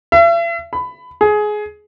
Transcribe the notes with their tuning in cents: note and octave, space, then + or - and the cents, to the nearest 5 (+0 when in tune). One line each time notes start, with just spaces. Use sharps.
E5 +45
B5 +20
G#4 +20